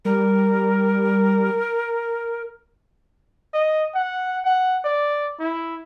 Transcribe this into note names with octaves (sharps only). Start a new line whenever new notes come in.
G3 A#4
D#5
F#5
F#5
D5
E4